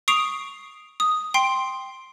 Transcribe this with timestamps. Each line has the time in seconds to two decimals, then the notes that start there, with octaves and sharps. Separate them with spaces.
0.08 C#6 D#6 C7 D7 F7
1.00 D#6
1.34 G5 C6 C7 D7